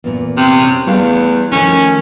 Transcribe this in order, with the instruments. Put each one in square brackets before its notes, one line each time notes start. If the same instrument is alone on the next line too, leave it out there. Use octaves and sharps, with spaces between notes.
[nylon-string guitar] E2 A#2
[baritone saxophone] C3
[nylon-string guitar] C4 C#4 A#4
[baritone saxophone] E2 [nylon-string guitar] G3 A3 F5
[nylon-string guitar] D#3 F3 A3 [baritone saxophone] C#4